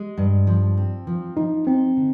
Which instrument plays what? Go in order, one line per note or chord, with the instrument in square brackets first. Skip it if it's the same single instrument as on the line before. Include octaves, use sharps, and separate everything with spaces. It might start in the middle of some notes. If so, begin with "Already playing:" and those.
Already playing: [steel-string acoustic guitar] G#3 [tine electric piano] G4
[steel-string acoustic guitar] G2
F3
C4
F3
[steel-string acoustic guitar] F3 [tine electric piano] D#4
[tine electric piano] C4 [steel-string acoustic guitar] D#4
[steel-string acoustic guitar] D3